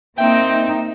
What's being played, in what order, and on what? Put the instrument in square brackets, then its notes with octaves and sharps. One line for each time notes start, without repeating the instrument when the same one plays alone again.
[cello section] A#3 D#4 [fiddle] C4 [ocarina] E5 [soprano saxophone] G5